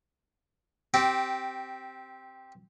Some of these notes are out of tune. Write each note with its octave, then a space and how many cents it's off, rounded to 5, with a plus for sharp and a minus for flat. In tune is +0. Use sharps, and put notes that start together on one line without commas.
C4 +0 G4 -15